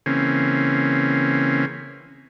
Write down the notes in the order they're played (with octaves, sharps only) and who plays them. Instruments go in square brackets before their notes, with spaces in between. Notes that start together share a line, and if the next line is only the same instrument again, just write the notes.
[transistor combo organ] C#3 E3 A#3 C4 C#4